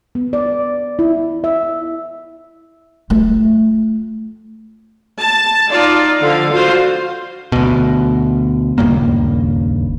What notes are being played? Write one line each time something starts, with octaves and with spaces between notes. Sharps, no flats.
B3
D5
E4
E5
A3 F4
A5
D#4 F4 D5
D3 F3 F5
F4 F#4 C5
D2 B2
D#1 C#2 G2 A#3